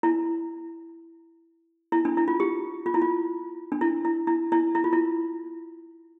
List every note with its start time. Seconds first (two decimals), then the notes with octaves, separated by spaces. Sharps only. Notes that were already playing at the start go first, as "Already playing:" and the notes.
0.03 E4
1.92 E4
2.05 D4
2.17 E4
2.28 F4
2.40 G4
2.86 F4
2.94 E4
3.02 F4
3.72 D4
3.81 E4
4.05 E4
4.27 E4
4.52 E4
4.75 E4
4.84 F4
4.93 E4